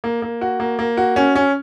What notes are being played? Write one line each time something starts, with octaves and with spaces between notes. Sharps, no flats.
A#3
A#3
F#4
A#3
A#3
F#4
C#4
C#4